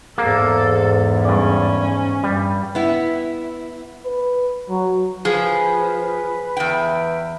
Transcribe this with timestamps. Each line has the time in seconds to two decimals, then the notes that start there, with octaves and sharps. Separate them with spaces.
0.18 E2 G#2 A#3 A4
1.24 G2 C#4 D5
2.23 G2 G3
2.75 B3 E4
4.05 B4
4.69 F#3
5.25 F3 G#4 B4
6.57 E2 G5